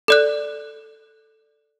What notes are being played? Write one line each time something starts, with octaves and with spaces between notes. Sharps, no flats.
A4 D5 F#6